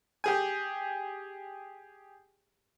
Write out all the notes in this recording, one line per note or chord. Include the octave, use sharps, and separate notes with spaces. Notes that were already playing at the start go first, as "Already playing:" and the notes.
G4 G#4 G#5